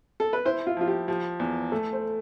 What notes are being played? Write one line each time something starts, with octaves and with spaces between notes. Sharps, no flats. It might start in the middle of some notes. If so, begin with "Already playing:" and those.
A4
B4
E4 C5
F4
F3 F4
G4
F3 G4
E2
A3 A4
C5